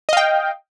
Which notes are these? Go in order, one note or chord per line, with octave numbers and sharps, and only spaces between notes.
D#5 F5 G5